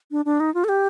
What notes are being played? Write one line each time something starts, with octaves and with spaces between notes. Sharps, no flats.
D4
D4
D#4
F4
A4
G4